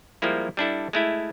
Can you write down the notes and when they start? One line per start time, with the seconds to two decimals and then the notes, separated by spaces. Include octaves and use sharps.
0.22 F3 G3 G#3 A#3 E4
0.57 G3 D4 E4 A4
0.93 G#3 A3 E4